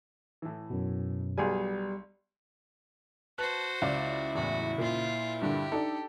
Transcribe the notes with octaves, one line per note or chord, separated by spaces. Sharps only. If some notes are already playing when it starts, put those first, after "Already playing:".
A2 E3
F#2 B2
B1 G3 G#4 G#5
F#4 B4 C5 A5 F#6
C#2 E4 D5 F5
E2 A2 F#4
A#2 F4 C5
G2 D3 G4
D4 D#4 A4